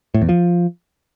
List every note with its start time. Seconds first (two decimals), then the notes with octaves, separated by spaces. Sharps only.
0.14 A2
0.22 E2
0.29 F3